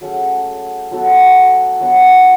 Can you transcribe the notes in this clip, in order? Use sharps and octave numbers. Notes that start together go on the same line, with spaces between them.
F#3 A3 C#4 G#4
F#3 B3 F#4 A4
F#3 B3 D4